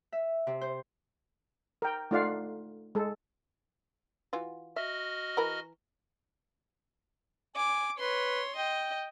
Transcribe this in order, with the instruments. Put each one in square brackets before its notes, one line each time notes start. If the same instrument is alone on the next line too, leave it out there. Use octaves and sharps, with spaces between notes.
[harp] E5
C3
C5
[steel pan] A#4 G5
A3 D#4 F4 D5 F5 F#5
G#3 A4
[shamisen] E3 F4 F#4
[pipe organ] F#4 D#5 F6 [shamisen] E5
[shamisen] E3 A#4 B5
[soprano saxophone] G#5 [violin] D6
[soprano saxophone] B4 [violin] C#5 C6
[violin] D#5 [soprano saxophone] G5